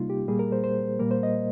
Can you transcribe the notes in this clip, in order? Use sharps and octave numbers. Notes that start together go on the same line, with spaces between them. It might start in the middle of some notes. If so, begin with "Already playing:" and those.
Already playing: C3 G3 A#3 D#4 F4
G4
A#2 G3 A#3 G#4
A#4
C5
C5
A#2 G3 A#3 A#4
C5
D#5